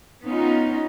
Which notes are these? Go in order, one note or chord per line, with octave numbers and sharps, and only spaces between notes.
B3 C#4 D#4 F4